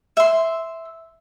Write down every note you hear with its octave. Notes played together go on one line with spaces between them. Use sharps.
E5 C6